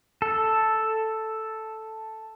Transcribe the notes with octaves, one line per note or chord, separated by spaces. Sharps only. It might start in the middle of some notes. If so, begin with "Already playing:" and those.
A4